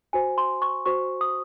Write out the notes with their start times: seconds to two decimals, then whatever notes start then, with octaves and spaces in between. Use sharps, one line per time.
0.13 F#4 C5 G#5
0.38 C6
0.62 C#6
0.86 F#4 C5 C#6
1.21 D#6